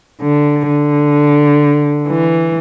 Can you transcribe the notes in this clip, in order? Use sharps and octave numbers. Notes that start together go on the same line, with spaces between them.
D3
D3
E3